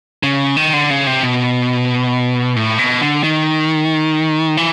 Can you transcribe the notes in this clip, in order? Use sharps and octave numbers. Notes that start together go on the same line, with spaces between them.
C#3
D#3
D3
C#3
C3
B2
A2
B2
D3
D#3
E3